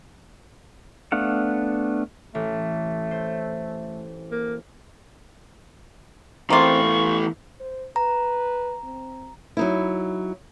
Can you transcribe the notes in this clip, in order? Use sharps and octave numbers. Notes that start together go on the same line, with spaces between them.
A3 B3 D4 F5 F#5
A1 A3
C5
A#3
E3 A3 A#3 C4 F4 C#6
B3
C5
B4 A#5
C4
F#3 D#4 E4